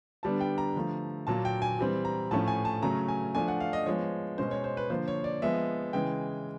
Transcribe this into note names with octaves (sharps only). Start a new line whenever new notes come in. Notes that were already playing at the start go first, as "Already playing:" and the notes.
D3 G3 B3 D4 A5
G5
A#5
D3 F3 A3
A#2 F#3 A#3 A5
G5
G#5
E3 G3 C4
A#5
A2 F3 A3 C#4 A5
G#5
A5
C#3 F#3 A3 C#4 A#5
G#5
F3 A3 D4 G#5
F#5
F5
D#5
F3 G#3 B3 C#5
B2 G#3 C#4 C5
C#5
C5
B4
D3 F3 A#3 C5
C#5
D5
F3 G#3 B3 E5
C#3 E3 G#3 G5